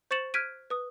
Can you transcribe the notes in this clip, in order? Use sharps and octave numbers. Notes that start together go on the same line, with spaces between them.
C5 C#6 A6 C#7 E7 F#7
F6 F#6 G#6 B6 D7 D#7
B4 D#6